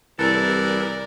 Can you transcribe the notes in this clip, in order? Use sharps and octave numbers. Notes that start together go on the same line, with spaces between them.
C2 E3 A4 A#4 D5